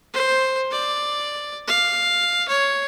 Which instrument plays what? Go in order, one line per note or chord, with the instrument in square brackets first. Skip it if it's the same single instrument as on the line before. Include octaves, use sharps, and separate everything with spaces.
[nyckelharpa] C5
D5
F5
C#5